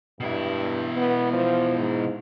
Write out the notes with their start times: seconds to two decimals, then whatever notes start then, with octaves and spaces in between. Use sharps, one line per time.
0.20 G2 B2 E4
0.97 B3
1.33 F3
1.77 G#2